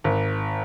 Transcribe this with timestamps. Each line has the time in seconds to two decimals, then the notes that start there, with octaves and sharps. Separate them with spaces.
0.04 G#1